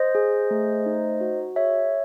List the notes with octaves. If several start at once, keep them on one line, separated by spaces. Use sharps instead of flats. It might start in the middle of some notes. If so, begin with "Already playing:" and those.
Already playing: C5 D#5
G#4
A3
D#4
F#4
G#4 C#5 E5